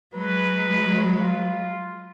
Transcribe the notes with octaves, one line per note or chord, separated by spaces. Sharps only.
F#3 G#3 B4
F4